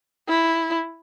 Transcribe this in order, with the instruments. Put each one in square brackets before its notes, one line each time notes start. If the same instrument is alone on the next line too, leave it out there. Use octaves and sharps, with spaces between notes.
[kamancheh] E4